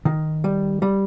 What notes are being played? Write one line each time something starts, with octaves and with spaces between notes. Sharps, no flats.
D#3
G3
G3